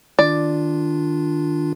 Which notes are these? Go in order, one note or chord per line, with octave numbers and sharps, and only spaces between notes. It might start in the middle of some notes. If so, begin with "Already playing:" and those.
D#3 D4 F4 D5